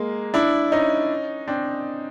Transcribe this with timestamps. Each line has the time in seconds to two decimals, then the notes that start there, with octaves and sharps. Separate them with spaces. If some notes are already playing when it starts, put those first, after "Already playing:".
Already playing: G#3 A#3
0.34 D4 E4
0.72 C#4 D#4
1.48 C4 D4